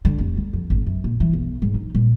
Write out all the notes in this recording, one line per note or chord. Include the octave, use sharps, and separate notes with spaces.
D3
F1
D2
F2
G#1
F#2
A#2
E3
B1
G#2
D#4
A#2